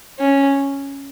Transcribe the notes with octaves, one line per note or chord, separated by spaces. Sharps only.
C#4